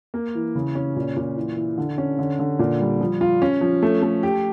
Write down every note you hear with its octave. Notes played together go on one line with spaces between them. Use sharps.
A#3
E3
C#3
C#4
A#2
A#2
E3
E3
D3
C#4
D3
D3
A#2
G3
F3
F4
C#4
F3
A3
A3
G4